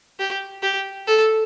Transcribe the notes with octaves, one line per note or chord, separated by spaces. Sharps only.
G4
G4
A4